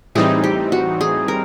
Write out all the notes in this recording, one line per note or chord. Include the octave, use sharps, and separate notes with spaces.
A2 E3 G3 C4 D#4 G#4
G4
F#4
G#4
A#4